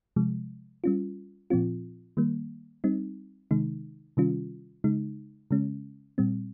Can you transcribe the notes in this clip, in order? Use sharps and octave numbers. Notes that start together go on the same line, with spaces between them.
C3 F3 G#3
G3 C#4 F4
A#2 F3 C4 F4
D#3 G3 A#3
G3 C4 D#4
C3 D#3 G#3 D#4
C3 D#3 G3 C#4 F4
C#3 G#3 D#4
C#3 G#3 C#4
A#2 G3 C4